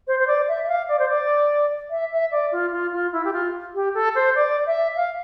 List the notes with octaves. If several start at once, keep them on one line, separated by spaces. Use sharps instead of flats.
C5
C5
D5
E5
E5
F5
D5
C5
D5
E5
E5
D5
F4
F4
F4
E4
G4
F4
G4
A4
C5
D5
E5
F5